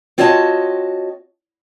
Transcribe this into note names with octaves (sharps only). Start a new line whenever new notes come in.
C4 F4 F#4 C#5 D#5 A5